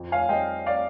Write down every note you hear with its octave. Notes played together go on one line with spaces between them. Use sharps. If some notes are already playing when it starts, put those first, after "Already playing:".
Already playing: F2
F5 G#5
G3 D#5 G5
D5 F5